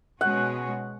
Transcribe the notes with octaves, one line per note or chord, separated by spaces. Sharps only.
B2 G#3 C#4 F#4 F#5